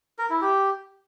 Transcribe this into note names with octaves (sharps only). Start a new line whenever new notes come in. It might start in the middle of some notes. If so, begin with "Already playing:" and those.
A#4
E4
G4